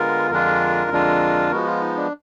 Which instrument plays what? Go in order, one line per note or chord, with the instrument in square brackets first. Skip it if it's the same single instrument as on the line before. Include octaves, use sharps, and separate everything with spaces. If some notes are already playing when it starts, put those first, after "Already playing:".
Already playing: [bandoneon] D3 G#3 B3 F4 [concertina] A#4
[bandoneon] F2 D3 G#3 D4 F4 [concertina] A#4
[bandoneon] F2 D3 G#3 D4 F4
[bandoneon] F3 G#3 B3 [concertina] F#4
[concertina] F4
D#4
D4